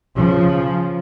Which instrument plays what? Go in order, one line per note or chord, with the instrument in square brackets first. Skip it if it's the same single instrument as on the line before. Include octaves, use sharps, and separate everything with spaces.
[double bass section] C#3 F3